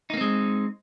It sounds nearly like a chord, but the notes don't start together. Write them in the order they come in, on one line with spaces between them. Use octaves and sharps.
D#4 A#3 C4 G#3